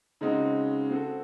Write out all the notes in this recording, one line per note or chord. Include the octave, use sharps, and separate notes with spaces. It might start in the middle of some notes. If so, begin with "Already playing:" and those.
C#3 G#3 C4 D#4 F#4
C4 F#4 A4